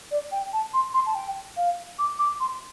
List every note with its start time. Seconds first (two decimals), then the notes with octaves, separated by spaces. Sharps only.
0.11 D5
0.32 G5
0.53 A5
0.74 C6
0.94 C6
1.06 A5
1.15 G5
1.57 F5
1.99 D6
2.19 D6
2.40 C6